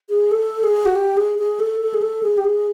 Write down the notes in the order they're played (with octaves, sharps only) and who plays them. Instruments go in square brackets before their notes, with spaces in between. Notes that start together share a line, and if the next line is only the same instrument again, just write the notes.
[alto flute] G#4
A4
G#4
F#4
G4
G#4
G#4
A4
A4
G#4
A4
G#4
G4
G#4